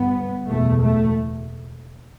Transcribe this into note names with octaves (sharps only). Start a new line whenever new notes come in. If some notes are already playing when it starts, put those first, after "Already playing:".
Already playing: G1 G2 B3
F#1 E2 B2 A3
A3